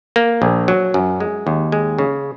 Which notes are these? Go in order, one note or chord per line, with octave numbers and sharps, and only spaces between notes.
A#3
A#1
F#3
F#2
G#3
D#2
G#3
C#3